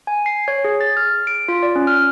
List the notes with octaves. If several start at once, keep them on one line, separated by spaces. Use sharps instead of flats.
G#5
C7
C#5
G#4
A6
F6
D7
F4
D5
C#4
F6